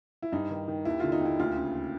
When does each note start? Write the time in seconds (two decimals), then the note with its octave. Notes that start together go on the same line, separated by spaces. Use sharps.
0.22 E4
0.32 G2 D#4
0.50 D#3
0.68 D#3
0.85 D#2 E4
1.00 D3 F4
1.12 D#4
1.21 D#2 E4
1.39 D2 F4
1.57 C#3